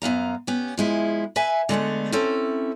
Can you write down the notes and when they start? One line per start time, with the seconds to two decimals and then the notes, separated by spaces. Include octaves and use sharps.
0.02 F#2 B3 F5 A#5
0.47 B3 C#4 G4
0.77 F3 G#3 E4
1.36 B4 E5 G#5
1.69 D3 G#3 A3 B3
2.12 C4 C#4 E4 A4